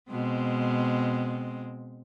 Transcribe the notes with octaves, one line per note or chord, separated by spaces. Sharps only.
B2 G#3 C4